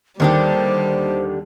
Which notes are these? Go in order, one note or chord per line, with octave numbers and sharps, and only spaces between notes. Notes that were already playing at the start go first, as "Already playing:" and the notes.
D#2 D3 D#3 G3 D4 D#4 G4 C5